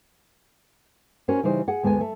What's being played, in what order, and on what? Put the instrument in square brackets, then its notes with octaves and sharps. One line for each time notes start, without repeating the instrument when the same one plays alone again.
[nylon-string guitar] C#4 F#4 A#4 C5
C#3 E3 G3 D#4 C5
G#4 F#5
D2 G#3 B3 F#5 G#5
A3